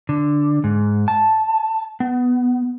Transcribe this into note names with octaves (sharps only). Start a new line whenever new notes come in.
D3
G#2
A5
B3